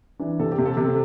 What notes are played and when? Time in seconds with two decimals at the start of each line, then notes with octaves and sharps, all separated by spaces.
0.19 E3 D4
0.39 C3 A4
0.52 G4
0.58 C3
0.66 A4
0.77 C3